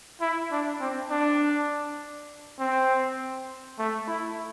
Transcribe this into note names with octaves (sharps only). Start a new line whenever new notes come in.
E4
D4
C4
D4
C4
A3
E4